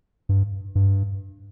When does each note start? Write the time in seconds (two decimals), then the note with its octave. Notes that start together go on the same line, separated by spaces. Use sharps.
0.29 G2
0.75 G2